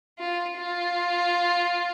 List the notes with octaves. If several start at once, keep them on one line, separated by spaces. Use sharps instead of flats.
F4
F4